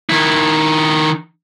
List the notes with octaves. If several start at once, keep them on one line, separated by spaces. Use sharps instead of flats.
D#3 E4